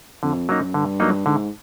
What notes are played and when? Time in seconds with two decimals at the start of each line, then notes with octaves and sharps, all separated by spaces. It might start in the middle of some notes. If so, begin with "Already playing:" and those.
0.23 F2 D3
0.49 F#2 F#3 A#3 D#4
0.74 G2 D3
1.00 F#3 A#3 D#4
1.26 G#2 D3